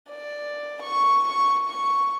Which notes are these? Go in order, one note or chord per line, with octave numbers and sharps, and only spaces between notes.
D5
C#6
C#6
C#6